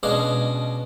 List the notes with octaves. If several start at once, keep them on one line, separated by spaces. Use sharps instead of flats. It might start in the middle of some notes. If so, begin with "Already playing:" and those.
B2 G#3 C#4 D4 G#4 F5